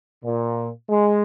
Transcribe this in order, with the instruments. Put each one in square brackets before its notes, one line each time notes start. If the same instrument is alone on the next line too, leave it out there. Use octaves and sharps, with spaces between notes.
[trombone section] A#2
G#3